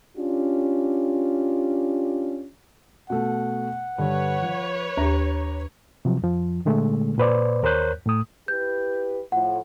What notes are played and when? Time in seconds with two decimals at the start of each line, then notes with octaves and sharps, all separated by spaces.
0.17 C#4 D4 F4 G4
3.10 B2 A3 F#5
3.98 G2 D3 B4 C#5
4.42 F3
4.97 D#2 G4 A#5
6.05 C3 F3 F#3
6.22 F2 F3
6.65 A#2 D3 G#3 A3
7.18 A#2 B4 C5 D5
7.63 D#2 A#4 C5 C#5 F#6 G6
8.06 A2 A3 D#6
8.48 E4 G4 B4 G6
9.32 A2 F3 F#5